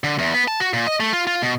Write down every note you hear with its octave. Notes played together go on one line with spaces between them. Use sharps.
D3
E2
B3
A5
F#4
A#2
D#5
A3
F4
F4
B2